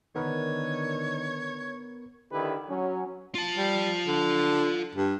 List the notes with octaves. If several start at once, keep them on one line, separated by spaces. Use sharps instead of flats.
D3 D#3 B3 A#4 B4 C#5
D3 D#3 D#4 E4 G4 B4
F#3 C#4
F4 A5
G3
D3
G2